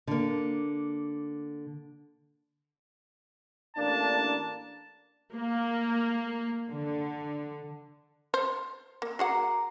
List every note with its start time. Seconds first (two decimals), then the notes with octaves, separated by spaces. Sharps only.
0.07 D3 A#3
3.76 A1 A#3 D4 A5
5.33 A#3
6.70 D3
8.34 C5
9.02 A#3 A#4
9.19 F#4 G#4 F#5 A#5 D6 C7